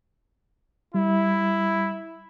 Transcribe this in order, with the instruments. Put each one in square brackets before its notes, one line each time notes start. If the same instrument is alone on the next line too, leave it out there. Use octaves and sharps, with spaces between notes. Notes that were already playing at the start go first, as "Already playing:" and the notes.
[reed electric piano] G3 [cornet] E4